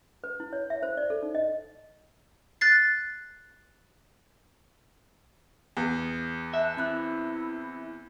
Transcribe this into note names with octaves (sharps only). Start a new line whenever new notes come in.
B4
E4
C#5
E5
C5
D5
A4
D#4
D#5
F#6 A6 C7
E2
E5 A5 F#6
C4 E4 B5 F#6